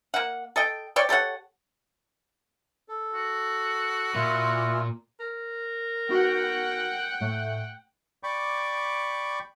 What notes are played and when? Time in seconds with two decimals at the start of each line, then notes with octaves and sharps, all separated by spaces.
0.14 A#3 F#5
0.56 A4 D#5 G5
0.96 C#5 D5 G5
1.09 G4 A4 C#5 F#5
2.88 A4
3.14 F#4
4.15 A#2 E4 F4
5.20 A#4
6.09 B3 D#4 F#4 F#5 G5
7.20 A2 A3
8.23 D5 G5 B5 C#6 D6